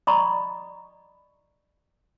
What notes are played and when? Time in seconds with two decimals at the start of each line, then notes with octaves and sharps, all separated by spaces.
0.07 D5 D#5 A#5 B5 C#6 D#6